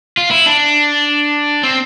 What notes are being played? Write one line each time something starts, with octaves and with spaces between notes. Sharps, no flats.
F4
E4
D4
C4